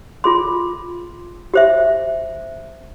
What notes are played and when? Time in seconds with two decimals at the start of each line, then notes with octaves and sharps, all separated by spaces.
0.24 F4 G#4 C6
1.54 G4 C5 E5